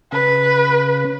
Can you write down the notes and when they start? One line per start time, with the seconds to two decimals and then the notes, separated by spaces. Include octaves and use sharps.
0.12 C#3 B4